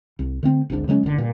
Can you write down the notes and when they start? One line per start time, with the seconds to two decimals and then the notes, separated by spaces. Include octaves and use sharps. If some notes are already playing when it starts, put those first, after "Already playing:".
0.19 C2
0.43 D3 A3 C4
0.70 G#1 D2 G#2 D4
0.88 C#3 F#3 G#3 C#4
1.03 F#1 D3
1.18 G2 A#2